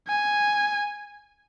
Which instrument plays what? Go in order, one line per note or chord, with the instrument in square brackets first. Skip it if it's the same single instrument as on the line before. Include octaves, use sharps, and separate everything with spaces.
[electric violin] G#5